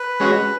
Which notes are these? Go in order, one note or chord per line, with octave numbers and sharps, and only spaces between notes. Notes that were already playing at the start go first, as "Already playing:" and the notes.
Already playing: B4
G#3 C#4 F#4